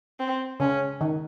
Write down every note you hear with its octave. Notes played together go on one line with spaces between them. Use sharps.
C4
C#3 C#4
D#3